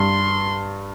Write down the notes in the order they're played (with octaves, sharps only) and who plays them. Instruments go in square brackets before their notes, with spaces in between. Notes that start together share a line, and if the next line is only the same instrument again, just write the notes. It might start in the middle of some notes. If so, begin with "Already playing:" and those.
Already playing: [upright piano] G2 [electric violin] C6